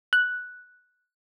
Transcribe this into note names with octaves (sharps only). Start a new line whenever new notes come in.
F#6